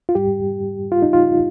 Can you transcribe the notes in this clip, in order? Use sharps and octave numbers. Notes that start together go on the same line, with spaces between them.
F4
G#2 G3 G4
F4
D#4
F4